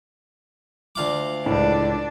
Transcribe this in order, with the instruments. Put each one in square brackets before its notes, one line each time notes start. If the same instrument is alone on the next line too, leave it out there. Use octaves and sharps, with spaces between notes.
[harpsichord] D2 F4 D6
[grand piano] C#2 A2 [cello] D4